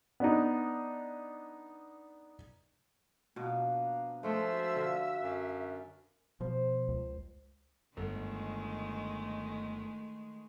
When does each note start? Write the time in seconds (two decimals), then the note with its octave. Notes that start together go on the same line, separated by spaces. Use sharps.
0.20 B3 D4 D#4
3.36 B2 F3 A#3 D4 B4
4.23 F3 G#3 A3 D4 A4 E5 G5
4.44 F#4
4.76 D3 F4 F#4 D6
5.22 F#2 F#3 D5 F5
6.40 B2 F3 C5
6.88 C#2
7.97 G1 D#3 G#3 A3